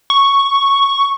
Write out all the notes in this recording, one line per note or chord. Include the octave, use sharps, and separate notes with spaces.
C#6